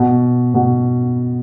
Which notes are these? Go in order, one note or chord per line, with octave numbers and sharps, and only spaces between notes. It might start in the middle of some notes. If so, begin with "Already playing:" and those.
Already playing: B2
B2